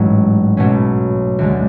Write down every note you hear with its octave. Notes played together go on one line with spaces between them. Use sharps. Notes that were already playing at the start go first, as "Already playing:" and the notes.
Already playing: A1 G#2 F#3 C#4
B1 B2 F#3 A3 C#4
D2 D3 G#3